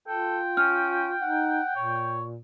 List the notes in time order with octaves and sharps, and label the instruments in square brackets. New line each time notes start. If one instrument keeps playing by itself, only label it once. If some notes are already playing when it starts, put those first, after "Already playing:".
[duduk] F4 [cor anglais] A4 [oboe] G5
[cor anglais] C#4 [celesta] F6
[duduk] D#4 [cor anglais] F#5
[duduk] A#2 [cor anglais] C#5